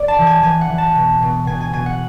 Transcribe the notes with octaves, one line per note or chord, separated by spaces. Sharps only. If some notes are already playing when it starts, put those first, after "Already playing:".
Already playing: D5
A5
E3
G#5
E3 G#5
F#5
E3
A5
B2
B2
B2 G#5
G#5
B2 G#5
F#5